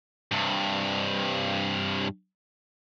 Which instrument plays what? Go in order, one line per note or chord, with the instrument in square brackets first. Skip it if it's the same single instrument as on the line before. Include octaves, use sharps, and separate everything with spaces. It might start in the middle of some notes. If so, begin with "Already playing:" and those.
[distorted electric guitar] G2 C3